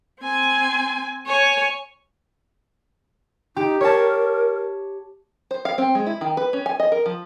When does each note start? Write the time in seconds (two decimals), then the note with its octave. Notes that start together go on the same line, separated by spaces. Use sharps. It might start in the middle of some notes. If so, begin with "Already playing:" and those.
0.21 C4 G#5
1.27 C#5 G#5
3.56 D#4 G4
3.81 A#4 C#5 A5
5.51 C5
5.65 F5
5.78 C4
5.95 G#3
6.07 E4
6.21 D#3
6.37 B4
6.53 C#4
6.66 G#5
6.80 D#5
6.92 A#4
7.06 F3